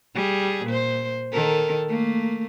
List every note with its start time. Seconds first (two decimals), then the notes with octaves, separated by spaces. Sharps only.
0.15 G3 G#4
0.65 A#2 C5
1.32 D#3 A4 A#4
1.89 A3 A#3